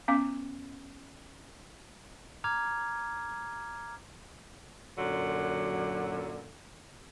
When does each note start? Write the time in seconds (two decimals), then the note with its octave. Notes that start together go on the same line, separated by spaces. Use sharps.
0.08 B3 C#4 F5 D6
2.44 A#5 D6 F6 G#6
4.98 F#2 A#2 D3 F#3